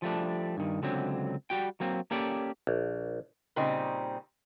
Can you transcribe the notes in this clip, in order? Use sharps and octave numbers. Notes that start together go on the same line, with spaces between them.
F3 G3 A3 D4
G2 D#3
C#2 D3 F#3 C4
G3 F#4 G5
F#3 A#3 C4
A#3 C#4 G4 A4 D5
A#1
A#2 C#3 G3 C4 D#4